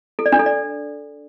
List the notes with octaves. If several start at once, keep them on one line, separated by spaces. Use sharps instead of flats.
A4
D5
D4
A4
D5